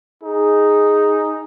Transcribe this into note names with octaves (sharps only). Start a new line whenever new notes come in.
D#4 G#4